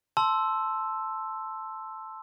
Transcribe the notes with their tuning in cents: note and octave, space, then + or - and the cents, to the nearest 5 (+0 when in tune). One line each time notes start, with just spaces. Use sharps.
A5 +0 C6 +0 E6 +0